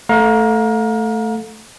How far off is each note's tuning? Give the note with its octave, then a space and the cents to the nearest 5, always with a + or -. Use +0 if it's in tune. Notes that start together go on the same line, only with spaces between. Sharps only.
A3 +0 F5 +35 A#5 +15